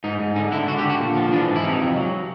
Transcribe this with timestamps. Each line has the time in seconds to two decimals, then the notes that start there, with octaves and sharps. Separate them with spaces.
0.04 G#2 D#4
0.20 G#2
0.36 D3 D#4
0.52 D3 E4
0.68 D3 F#4
0.79 G4
0.84 D3
0.89 F#4
1.00 A#2
1.16 F3
1.32 E3 D4
1.48 G#2
1.56 E4
1.64 C3 D#4
1.80 F2
1.96 F#3